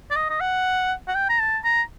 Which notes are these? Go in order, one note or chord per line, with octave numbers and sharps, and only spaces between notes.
D5
D#5
D#5
F#5
F#5
G5
A#5
A5
A#5